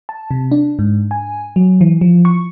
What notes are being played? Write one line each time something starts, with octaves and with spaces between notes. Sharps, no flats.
A5
C3
D4
G#2
G#5
F#3
E3
F3
C#6